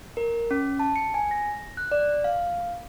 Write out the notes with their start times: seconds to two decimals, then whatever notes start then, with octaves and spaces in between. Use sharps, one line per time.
0.17 A#4
0.51 C#4
0.79 A5
0.96 C#7
1.14 G#5
1.31 A#6
1.77 F#6
1.92 D5
2.24 F5